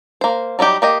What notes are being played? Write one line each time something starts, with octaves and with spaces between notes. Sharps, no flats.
A#3 C5
F#3 G3 D#4 G4
A#3 G4 D#5